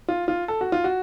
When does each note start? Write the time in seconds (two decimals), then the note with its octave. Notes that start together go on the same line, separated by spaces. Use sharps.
0.08 F4
0.28 F4
0.48 A4
0.61 F#4
0.72 F4
0.84 F#4